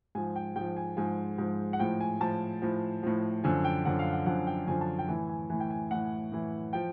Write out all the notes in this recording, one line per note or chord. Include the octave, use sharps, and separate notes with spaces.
G#2 F3 G#5
G5
G#2 F3 G5
G#5
G#2 F3 G#5
G#2 F3
F#5
A2 F3 G5
G#5
A2 F3 A5
A2 F3
A2 F3
F#2 D3 F3 G#5
G5
F#2 D3 F3 F#5
F5
F#5
F#2 D3 F3 F#5
G5
F#2 D3 F3 G#5
A5
G5
A2 E3 G#5
G#5
A2 E3 G#5
G5
G#5
A2 E3 F#5
A2 E3
F3 G5